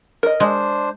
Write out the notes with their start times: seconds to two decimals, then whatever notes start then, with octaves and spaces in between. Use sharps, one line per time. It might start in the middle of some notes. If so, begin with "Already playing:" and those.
0.23 A#4 D#5
0.40 G#3 D4 C5